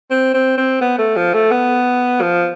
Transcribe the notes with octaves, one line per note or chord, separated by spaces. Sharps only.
C4
C4
C4
B3
A3
F3
A3
B3
F3